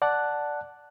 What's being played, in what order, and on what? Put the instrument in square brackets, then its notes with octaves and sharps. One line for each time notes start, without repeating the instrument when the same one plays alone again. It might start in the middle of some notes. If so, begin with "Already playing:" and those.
[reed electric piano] D5 F#5 A5 F#6